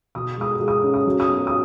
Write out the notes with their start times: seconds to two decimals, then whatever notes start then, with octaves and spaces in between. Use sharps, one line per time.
0.15 B2 D#6
0.38 G#3 D#6
0.60 G#3
0.68 D#6
0.83 C#4
0.94 D#6
1.06 F#3
1.20 D#6
1.29 B3
1.47 D#6